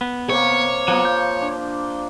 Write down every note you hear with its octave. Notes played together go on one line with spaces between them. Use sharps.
B3
C3 A#3 C#5
F3 F#3 A#3 B3
G6
D4